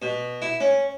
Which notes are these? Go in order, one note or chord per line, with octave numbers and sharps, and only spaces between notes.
B2
E4
C#4